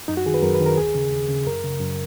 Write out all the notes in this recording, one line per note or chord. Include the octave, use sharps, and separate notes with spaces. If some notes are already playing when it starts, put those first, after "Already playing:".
F#2 D#4
F#4
D#3 G#4
B4
F#2 A#4
B4
D#3
A#4
D#2 G#4
C#3
D#2
C#3
F#2 A#4
C#3
F#2